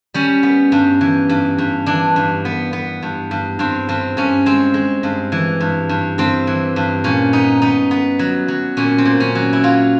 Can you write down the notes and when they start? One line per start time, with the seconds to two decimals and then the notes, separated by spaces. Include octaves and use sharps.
0.14 G3 C#4
0.43 B3
0.72 G2
1.01 E3
1.29 G2
1.58 G2
1.86 E3 D4
2.16 G2
2.45 B3
2.73 B3
3.02 G2
3.31 G2
3.59 G2 C4
3.89 G2 C4
4.17 G2 C#4
4.46 G#3 C4
4.74 G#3
5.03 G2
5.32 E3
5.61 G2
5.89 G2
6.18 G2 C4
6.47 E3
6.76 G2
7.04 A#2 C#4
7.33 B3 D#4
7.62 B3 D#4
7.91 B3
8.19 F#3
8.48 F#3
8.77 A#2 C#4
8.98 C4
9.05 A#2
9.20 C#4
9.35 F#3
9.53 E4
9.64 F#3 F4